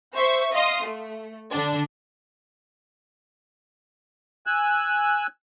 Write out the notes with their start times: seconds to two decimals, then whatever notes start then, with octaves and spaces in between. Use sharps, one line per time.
0.15 C5 E5 C#6
0.52 D#5 F5 C6 D#6
0.82 A3
1.51 D3 D4
4.46 G#5 E6 F#6